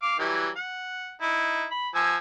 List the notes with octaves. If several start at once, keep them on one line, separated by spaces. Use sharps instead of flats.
F5 D6
E3 F#3 G3
F#5
D#4 E4
B5
F3 G#5 E6